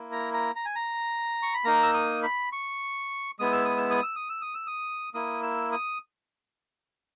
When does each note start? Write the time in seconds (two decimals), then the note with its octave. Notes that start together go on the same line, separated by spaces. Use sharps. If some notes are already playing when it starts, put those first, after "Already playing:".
Already playing: A#3 E4
0.12 A#5
0.34 A#5
0.56 A#5
0.65 G#5
0.76 A#5
1.42 C#6
1.54 B5
1.64 A#3 D#4 A#5
1.83 E6
1.94 D#6
2.23 B5
2.52 C#6
3.39 G#3 B3 E4 D#6
3.52 E6
3.65 D#6
3.78 E6
3.90 D#6
4.03 E6
4.16 D#6
4.29 E6
4.42 D#6
4.54 E6
4.67 D#6
5.14 A#3 E4 D#6
5.43 E6
5.72 D#6